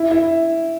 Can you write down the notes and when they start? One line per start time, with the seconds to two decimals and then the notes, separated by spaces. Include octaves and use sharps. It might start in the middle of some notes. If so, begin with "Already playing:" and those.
Already playing: E4
0.11 E4